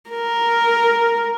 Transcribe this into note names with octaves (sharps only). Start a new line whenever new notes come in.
A#4